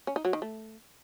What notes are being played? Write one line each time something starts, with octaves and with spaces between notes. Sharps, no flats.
C#4
D#4
F#3
D#3
A3